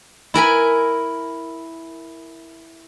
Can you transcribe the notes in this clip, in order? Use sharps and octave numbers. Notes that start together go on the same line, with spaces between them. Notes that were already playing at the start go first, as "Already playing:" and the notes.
E4 A#4 G#5 B5